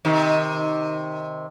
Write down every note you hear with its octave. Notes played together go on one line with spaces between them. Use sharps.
C3 D#3